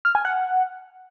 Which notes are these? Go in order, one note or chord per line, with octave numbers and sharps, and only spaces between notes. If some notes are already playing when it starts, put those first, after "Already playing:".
F6
G#5
F#5